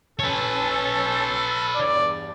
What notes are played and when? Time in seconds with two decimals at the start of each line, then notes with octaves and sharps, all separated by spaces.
0.19 C#4 A4 B4 C#5 A5 E6
1.75 E2 G2 D5